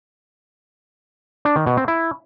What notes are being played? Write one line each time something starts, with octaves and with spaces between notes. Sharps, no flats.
D4
D#3
B2
C4
E4